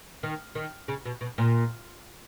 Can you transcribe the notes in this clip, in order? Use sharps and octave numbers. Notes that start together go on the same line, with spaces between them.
D#3
D#3
C#3
B2
B2
A#2